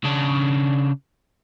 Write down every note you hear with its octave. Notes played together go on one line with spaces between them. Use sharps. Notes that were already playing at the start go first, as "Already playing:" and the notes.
C#3 D4